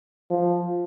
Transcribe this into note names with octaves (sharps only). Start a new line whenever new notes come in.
F3